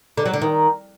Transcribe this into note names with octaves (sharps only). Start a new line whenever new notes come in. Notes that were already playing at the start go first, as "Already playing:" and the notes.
D3
F#3
D3
D#3